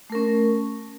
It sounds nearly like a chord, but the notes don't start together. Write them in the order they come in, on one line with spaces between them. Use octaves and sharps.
A3 A#4 C#4